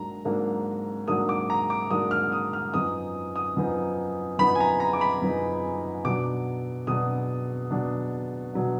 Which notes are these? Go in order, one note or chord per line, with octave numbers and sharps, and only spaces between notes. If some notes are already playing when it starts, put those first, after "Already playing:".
Already playing: G#2 F#3 A#3 D4 A#5
G#2 F#3 A#3 D4
G#2 F#3 A#3 D4 D#6
D6
A#5
D6
G#2 F#3 A#3 D4 D#6
F6
D#6
F6
F#2 F3 B3 D#4 D#6
D#6
F#2 F3 B3 D#4
F#2 F3 B3 D#4 B5
G#5
A#5
A#5
D6
B5
F#2 F3 B3 D#4
B2 F#3 D4 D6
B2 F#3 D4 D#6
B2 F#3 D4
B2 F#3 D4